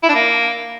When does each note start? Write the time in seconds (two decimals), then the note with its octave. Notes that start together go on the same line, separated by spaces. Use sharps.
0.03 E4
0.09 D4
0.14 A#3